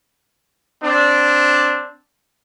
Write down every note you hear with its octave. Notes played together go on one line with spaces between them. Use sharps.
C4 D4